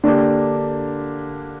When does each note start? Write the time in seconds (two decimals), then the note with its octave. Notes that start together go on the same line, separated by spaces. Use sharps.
0.04 D3 A#3 D4 G4